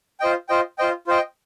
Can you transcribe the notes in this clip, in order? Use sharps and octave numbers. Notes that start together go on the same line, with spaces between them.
F4 C5 D#5 G5
F4 C5 D#5 G5
F4 C5 D#5 G5
F4 C5 D#5 G5